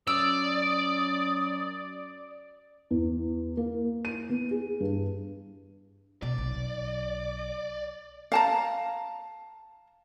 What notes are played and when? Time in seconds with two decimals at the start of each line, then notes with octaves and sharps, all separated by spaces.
0.07 F#2 D5 D#6 E6
2.91 E2
3.57 A#3
4.05 D#7
4.30 B3
4.51 G#4
4.80 G2
6.22 B2 D5
6.38 B1
8.32 F5 A5 A#5